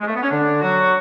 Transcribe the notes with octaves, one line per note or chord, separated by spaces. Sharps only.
G#3
A3
B3
C#4
D3 D4
F#3 F#4